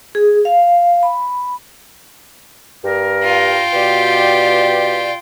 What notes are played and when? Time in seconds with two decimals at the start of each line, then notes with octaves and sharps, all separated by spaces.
0.15 G#4
0.45 F5
1.03 B5
2.85 G2 A#4
3.24 F4 G5
3.73 B2 G4 D5